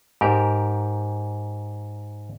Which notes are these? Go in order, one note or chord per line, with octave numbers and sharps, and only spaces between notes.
G#2 G4 A#4